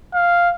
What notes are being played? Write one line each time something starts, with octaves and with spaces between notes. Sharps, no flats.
F5